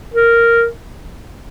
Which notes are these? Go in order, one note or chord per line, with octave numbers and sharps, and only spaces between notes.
A#4